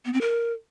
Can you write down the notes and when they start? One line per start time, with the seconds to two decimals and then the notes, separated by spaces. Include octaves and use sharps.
0.05 B3
0.13 C4
0.21 A#4